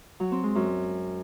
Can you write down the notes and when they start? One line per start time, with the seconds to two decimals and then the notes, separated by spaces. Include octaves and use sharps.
0.20 F#3
0.32 C4
0.44 G#3
0.55 F#2